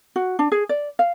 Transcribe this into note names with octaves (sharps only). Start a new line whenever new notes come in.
F#4
D4
G#4
D5
F5